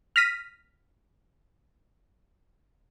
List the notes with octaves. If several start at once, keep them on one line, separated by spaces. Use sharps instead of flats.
F6 A#6 B6 D#7